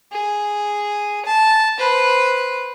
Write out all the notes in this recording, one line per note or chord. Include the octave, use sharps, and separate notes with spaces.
G#4
A5
B4 C5